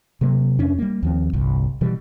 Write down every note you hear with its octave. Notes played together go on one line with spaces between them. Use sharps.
C3 F#3 A#3
F2 C#4 D4
G3 A#3
D#2 F3 C4
G1 C2
B2 E3 G3